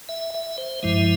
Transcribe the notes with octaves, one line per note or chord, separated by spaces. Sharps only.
E5
E5
C5
G2 F3 G#3 E4 E5